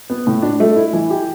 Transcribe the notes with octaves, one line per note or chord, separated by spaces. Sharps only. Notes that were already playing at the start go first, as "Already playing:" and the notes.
B3
A2
D4
A3
E4
E3
G4